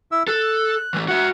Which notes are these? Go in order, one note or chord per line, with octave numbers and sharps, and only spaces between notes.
E4 E5 E6
A4 F#6
E3 A3
F#4 E5 F#5